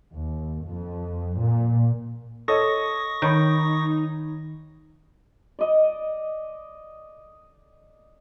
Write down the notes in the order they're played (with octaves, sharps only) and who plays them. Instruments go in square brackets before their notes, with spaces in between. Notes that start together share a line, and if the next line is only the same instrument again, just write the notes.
[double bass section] D#2
F2
A#2
[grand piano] A4 C#5 D#5 [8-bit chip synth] C#6 D#6 A#6
[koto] D#3 [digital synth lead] D#4 [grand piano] C#5 B5
[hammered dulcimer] D5 D#5